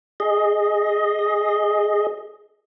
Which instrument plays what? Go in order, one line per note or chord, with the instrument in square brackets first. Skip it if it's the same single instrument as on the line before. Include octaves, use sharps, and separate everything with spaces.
[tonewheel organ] G#4 D#5